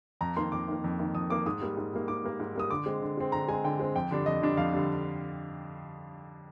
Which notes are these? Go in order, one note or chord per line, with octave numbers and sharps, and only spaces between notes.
F2 A#5
D#3 A#3 C6
F2 D6
D#3 A#3
F2
D#3 A#3
F2 D#6
D#3 A#3 D6
G#2 D#6
G3 A#3
G#2
G3 A#3
G#2 D6
G3 A#3
G#2
G3 A#3 D#6
D3 D6
G#3 C4
D3
G#3 C4
D3 A#5
G#3 C4 G#5
D3 G5
G#3 C4
F2 G5
D3 G3 D4
F2 D#5
D3 G3 D4
F2 F5
D3 G3 D4